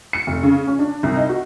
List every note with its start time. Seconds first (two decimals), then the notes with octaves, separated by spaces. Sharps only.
0.13 C#7
0.27 F1
0.43 C#3
0.67 C#4
0.79 D4
1.03 C2
1.17 D#4
1.29 F#4